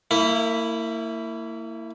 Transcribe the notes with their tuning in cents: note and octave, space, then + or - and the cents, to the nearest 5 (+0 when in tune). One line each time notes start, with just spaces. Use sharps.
A#3 -35 E4 +0